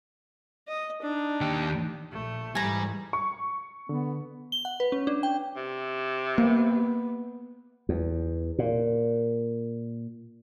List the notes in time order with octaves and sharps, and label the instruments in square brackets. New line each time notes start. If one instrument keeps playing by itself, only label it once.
[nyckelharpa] D#5
D4 D#4
[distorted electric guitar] D#2 G4
[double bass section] A#1 [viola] A3
[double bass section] G#2 E3 [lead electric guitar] G3 [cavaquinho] G#5 A#5
[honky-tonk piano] C#6
[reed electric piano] D3 [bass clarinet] B3
[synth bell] G7
F#5
B4
C#4
D4
G5
[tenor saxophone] C3
[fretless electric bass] A#3 [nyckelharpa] B3
[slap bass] E2
A#2